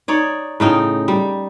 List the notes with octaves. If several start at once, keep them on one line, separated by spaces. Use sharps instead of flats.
D#4 C#5 D5
A2 C#3 D#4 G5
G3